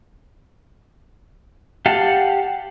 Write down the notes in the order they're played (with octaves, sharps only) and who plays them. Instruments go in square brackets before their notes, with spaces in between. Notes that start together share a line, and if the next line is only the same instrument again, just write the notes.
[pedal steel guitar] G4 F5 F#5 A5